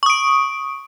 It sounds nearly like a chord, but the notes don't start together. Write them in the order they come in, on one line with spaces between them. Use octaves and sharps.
C#6 D#6 D7